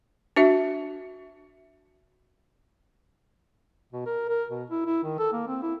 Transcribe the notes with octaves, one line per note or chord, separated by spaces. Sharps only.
D4 F#4 E5
B2
A#4
A#4
B2
E4
E4
D#3
A4
A#3
C4
E4